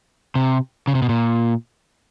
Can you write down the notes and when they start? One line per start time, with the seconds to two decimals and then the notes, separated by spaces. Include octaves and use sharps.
0.35 C3
0.87 C#3
0.95 C3
1.02 B2
1.09 A#2